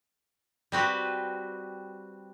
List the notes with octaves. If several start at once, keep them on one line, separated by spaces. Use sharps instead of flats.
G3 C4 F#4 B4